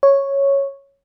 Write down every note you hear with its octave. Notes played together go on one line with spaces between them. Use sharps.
C#5